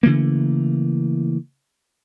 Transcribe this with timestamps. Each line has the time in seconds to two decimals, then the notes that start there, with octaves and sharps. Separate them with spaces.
0.03 C#3 E3 A3 A#3